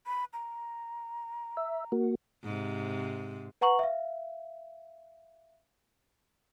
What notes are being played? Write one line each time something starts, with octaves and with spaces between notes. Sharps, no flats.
B5
A#5
E5
A#3 F#4
G#2 C3
B4 F#5 A#5 C#6 F#7
E5 F5